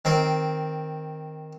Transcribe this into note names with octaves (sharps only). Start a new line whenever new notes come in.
D#3 C4 C5